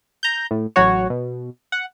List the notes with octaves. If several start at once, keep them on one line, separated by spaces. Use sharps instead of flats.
A#5 G6
A2
A1 F#3 F#4 C#5
B2
F#5